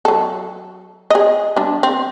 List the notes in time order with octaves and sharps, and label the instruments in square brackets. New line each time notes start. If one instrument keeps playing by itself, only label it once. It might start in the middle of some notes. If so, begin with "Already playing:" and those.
[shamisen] F#3 A4
G#4 D#5
G3 D4
C4